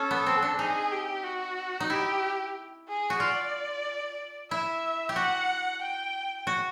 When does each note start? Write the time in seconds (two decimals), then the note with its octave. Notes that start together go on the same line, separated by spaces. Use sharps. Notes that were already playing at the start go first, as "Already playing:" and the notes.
Already playing: C#4 A4
0.11 B3
0.26 C4
0.42 D4
0.59 D#4 G#4
0.91 G4
1.24 F#4
1.80 D#4
1.90 E4 G4
2.88 G#4
3.10 F#4
3.20 F4 D5
4.51 E4 E5
5.09 G4
5.16 F#4 F#5
5.82 G5
6.47 F#4